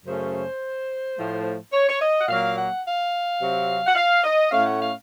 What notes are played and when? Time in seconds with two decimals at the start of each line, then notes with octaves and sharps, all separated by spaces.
0.06 F#2 C#3 A3 C#4 C5
1.17 A2 F3 A3
1.73 C#5
1.89 C#5
2.01 D#5
2.20 F#5
2.28 A#2 F#3 A#3 F5
2.56 F#5
2.85 F5
3.40 C3 F#3 C4
3.87 F#5
3.95 F5
4.24 D#5
4.51 A2 A3 C#4 F5
4.66 F#5
4.79 F5